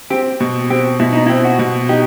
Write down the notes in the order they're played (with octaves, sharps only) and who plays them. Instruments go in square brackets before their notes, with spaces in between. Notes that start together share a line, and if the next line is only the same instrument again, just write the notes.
[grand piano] C4 [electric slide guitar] G4
[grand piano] B2
[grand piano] C4 [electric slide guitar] G4
[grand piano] B2 [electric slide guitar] E4
[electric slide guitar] D#4
E4
[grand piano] C4
[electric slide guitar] F#4
[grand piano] B2
[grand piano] D#4 [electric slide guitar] G4